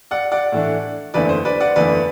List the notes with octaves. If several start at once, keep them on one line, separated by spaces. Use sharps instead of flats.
D5 F#5
D5 F#5
A2 E3 A3 D4
F#1 E2 D3 A3 E4 B4 D5
C5
B4 D5
D5 F#5
F#1 E2 D3 A3 E4 B4 D5